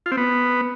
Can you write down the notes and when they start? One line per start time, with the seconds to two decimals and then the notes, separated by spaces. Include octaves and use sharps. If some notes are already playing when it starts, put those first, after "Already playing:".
0.06 F4
0.12 C4
0.17 B3